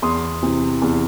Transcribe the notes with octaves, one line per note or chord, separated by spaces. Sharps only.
E2 C6 D#6
C3 E3
E2